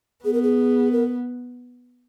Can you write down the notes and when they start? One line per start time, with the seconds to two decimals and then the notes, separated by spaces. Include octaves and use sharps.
0.24 B3 G#4
0.33 A#4
0.43 G#4
0.92 A#4